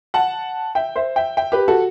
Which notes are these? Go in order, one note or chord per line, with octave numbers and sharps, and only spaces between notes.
F#5 A5
E5 G5
C5 E5
E5 G5
E5 G5
G4 B4
F#4 A4